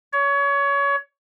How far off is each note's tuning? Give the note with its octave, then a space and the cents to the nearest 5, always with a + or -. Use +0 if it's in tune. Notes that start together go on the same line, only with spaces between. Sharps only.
C#5 +25